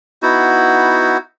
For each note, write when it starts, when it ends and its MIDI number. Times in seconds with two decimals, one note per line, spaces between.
0.22 1.17 59
0.22 1.17 63
0.22 1.17 64
0.22 1.17 66